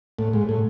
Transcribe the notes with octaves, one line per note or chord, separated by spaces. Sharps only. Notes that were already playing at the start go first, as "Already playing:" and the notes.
A2
G#2
A2